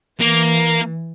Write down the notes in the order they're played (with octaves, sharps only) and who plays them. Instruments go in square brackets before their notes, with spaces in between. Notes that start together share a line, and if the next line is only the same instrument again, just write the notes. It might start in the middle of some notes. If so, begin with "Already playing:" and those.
[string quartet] E3 [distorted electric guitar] A#3